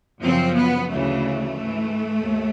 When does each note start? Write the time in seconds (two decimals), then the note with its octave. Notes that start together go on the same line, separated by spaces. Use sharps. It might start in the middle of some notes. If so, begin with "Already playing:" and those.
0.22 F#2 C#3 F3 C4
0.56 B3
0.89 D2 C#3 E3 A3
1.55 G#2 E3
2.21 D#2